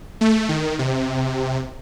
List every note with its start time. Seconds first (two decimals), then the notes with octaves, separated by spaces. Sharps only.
0.21 A3
0.49 D#3
0.79 C3